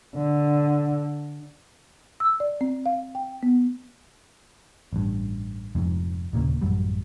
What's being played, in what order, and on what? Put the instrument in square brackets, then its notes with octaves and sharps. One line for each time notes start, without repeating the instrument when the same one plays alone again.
[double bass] D3
[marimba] E6
D5
C4
F5
G5
B3
[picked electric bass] A1 G2
F1 F2 G#2
D#1 A#2 C#3 A#3
A1 F#2 F#3 G3